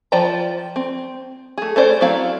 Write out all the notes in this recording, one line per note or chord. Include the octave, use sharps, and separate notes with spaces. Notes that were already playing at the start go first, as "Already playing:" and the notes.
F3 C5 D5 G5 A#5
C4
A3 G#4
A3 C#4 C5 D5
F#3 C4 E4 F5 A#5